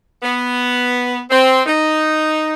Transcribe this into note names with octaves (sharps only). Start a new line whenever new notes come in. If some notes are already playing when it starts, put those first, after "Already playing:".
B3
C4
D#4